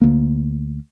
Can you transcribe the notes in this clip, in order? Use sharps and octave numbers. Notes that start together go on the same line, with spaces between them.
D2 A#3